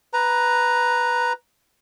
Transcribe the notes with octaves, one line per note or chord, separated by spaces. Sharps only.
B4 A#5